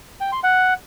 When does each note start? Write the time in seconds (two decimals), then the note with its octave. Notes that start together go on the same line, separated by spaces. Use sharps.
0.20 G5
0.32 C6
0.44 F#5